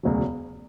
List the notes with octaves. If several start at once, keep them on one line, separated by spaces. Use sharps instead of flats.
E1 D2 C#3 F#3